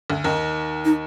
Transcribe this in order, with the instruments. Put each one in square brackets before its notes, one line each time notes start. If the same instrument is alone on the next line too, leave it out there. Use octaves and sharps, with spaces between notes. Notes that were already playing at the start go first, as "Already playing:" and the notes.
[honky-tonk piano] D2 D3
D#2 D#3
[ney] D#4